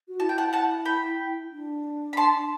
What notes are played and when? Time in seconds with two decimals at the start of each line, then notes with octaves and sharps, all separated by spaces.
0.08 F#4
0.20 E4 A5
0.29 G5
0.38 F#5 A5
0.53 F#5 A5
0.85 G5 B5
1.51 D4
2.13 B5
2.17 A5 C6